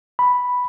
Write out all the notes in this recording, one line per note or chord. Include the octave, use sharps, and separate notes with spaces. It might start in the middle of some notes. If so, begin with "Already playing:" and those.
B5